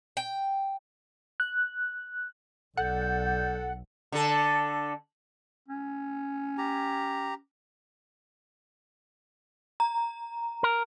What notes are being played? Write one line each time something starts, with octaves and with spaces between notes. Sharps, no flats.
G5
F#6
B1 A4 D5 F#5 G6
D3 A4
C#4
G4 A#5
A#5
A#4